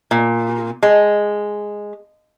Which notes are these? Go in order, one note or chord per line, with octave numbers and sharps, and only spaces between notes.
A#2
G#3